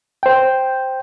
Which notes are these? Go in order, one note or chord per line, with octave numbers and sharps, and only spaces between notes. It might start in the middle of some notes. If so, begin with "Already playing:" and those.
C5 G5